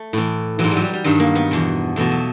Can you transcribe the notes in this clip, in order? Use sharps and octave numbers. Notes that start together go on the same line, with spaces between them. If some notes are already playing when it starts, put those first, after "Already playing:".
Already playing: A3
A2 E3
G#2 E3 F#3
G3
F#3
G3
G3
G2 D#3 F#3
A#3
B3
E2 B2
E2 B2 A3
F#3